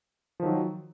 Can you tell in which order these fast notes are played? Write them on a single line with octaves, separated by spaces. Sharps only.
F3 D#3 F#3